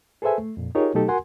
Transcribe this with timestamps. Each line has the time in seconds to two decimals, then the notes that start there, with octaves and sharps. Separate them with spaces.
0.22 G#4 A4 B4 C5 E5 G#5
0.38 A3
0.57 F2 A#2
0.75 D#4 F4 G4 G#4 A#4 C#5
0.94 B2 F#3 A3 D#4 G4 A4
1.08 F#4 A#4 F#5 G#5 C6